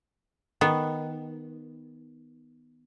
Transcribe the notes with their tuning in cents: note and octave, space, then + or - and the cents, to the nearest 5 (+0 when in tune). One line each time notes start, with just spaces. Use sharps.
D#3 +0 B3 +0